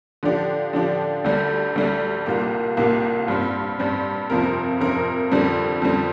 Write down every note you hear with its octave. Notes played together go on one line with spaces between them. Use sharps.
D3 F3 D4 G4
D3 F3 D4 G4
D2 D3 G3
D2 D3 G3
C2 A#2 A#3 G4
C2 A#2 A#3 G4
G2 G3 C4
G2 G3 C4
F2 C3 F3 C4 A#4
F2 C3 F3 C4 A#4
F2 D3 G3 C4
F2 D3 G3 C4